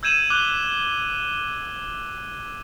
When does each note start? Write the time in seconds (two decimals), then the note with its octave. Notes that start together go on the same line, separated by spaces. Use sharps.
0.03 E6 G6 G#6 D#7 E7 F#7
0.30 D6 F#6 G6 F7 G7